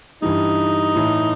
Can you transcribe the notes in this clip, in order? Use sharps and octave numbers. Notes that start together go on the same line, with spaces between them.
G2 E3 G3 D#4
A2 E3 A3